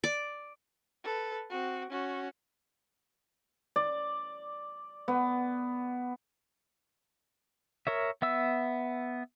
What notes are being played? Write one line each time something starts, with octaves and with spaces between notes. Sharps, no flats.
D5
A4 B4
C4 F#4
C#4 F#4
D5
B3
A#4 C#5 E5
B3 E5 E6